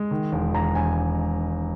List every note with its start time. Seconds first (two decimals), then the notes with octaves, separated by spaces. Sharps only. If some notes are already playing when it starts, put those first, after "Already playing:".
Already playing: G#3
0.11 D#3
0.32 E1
0.54 E1 A#5
0.75 E1 G#5